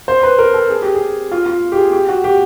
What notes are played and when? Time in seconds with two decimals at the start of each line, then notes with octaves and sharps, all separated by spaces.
0.08 C5
0.23 B4
0.38 A#4
0.54 A4
0.70 G#4
0.82 G4
0.95 G#4
1.32 F4
1.46 F4
1.72 G4
1.77 G#4
1.92 G4
2.08 F#4
2.24 G4